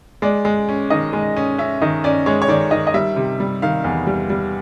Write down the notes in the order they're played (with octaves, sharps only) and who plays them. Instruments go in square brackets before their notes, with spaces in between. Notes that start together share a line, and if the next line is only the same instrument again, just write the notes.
[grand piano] G#3 D5
G#3
C#4
D#3 D#5
G#3
C#4
C#4 E5
D#3 D#5
C#4 D5
G#3 C#5
C#5
D#3 D5
D#3 D#5
D#5
G3 E5
C3
G3
D#3 F5
E2
G3
G3